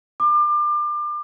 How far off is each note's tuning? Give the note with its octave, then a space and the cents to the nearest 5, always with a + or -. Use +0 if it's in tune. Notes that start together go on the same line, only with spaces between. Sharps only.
D6 +30